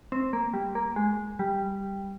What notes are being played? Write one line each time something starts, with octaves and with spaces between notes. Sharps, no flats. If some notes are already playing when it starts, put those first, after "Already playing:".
C4
A#3
G3
A#3
G#3
G3